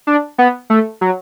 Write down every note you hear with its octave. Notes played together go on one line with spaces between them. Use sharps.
D4
B3
A3
F#3